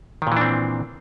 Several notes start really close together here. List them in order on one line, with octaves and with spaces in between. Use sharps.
D#3 A#2 E3 D4 C4